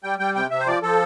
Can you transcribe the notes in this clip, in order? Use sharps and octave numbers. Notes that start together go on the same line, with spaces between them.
G3 G5
G3 G5
C3 G5
C3 E5
C5
F3 D5
F3 A4